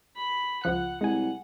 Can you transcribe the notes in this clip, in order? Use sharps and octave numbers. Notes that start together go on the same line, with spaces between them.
B5
C#2 F3 F#5 F#6
C2 G#3 F#5 G#5